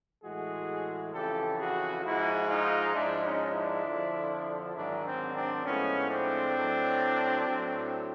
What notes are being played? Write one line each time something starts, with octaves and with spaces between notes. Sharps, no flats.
A2 E3 G#3 F#4 G#4
F2 C#3 E3 G4 A4
F#4 G#4
G#2 F3 G#3 E4 F#4
D#4 F4
G#2 F3 G#3 D4 E4
C#4 D#4
D4 E4
F2 D3 F3
G#2 D#3 F#3 D4 E4
C4 D4
C4 D4
A2 F3 G#3 B3 C#4
C4 D4
A2 F#3
A2 F#3